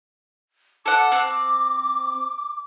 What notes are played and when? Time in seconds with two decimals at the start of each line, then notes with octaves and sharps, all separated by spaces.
0.86 A4 F#5 D6
1.12 C4